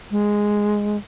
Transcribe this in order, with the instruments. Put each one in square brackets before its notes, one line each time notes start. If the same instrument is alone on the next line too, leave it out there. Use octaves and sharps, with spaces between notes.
[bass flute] G#3